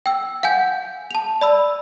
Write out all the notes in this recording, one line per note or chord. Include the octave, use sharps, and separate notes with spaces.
G5 E6
F5 F#5 G#5 G6
A5 F7
D5 B5 E6